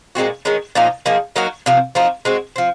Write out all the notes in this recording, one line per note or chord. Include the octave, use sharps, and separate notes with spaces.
A#2 G#3 C4 F#4
D#3 G#3 C#4
A#2 F3 A#3 D#4
F3 A#3 D#4 G#4
F#3 A#3 D#4 F#4
C3 F3 C4
F3 C4 D#4 F#4
G#3 C4 F#4
F3 C4